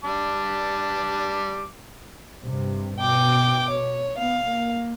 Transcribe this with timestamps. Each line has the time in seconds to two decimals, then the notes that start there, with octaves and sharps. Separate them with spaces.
0.04 G3 A5 D6
2.45 G2 C3
2.99 B2 G5 D6
3.70 C#5
4.18 B3 F5
4.47 A#3